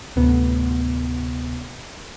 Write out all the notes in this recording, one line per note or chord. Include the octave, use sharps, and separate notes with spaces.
D2 A2 C3 B3